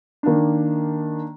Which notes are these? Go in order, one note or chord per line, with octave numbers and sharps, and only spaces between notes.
D#3 A#3 D4